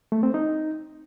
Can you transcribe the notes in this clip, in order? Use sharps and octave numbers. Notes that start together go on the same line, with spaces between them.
A3
C4
D#4